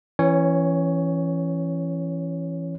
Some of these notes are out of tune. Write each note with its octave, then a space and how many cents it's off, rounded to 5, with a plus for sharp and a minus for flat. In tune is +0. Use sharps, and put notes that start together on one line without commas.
E3 +20 C#4 -20 C#5 +10